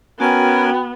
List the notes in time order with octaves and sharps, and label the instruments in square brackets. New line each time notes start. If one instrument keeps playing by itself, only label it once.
[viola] B3 [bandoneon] C#4 A#4 G#5 [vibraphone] F#4 G5